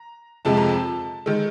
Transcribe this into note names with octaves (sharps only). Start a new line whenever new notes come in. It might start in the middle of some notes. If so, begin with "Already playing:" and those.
Already playing: A#5
F2 C3 F3 G#3 A5
A#5
A5
D#3 G#3